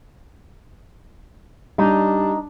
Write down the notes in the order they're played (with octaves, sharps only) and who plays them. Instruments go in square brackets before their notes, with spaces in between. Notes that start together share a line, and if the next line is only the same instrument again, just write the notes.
[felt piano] G3 [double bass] D4 [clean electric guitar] D#4